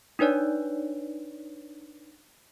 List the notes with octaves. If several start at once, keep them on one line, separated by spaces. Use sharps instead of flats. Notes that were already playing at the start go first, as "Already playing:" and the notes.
D4 D#4 B4 C#5 D5